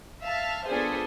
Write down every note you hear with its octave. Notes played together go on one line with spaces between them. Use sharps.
E5 F5 A5
B3 D4 F4 G#4 A4 C5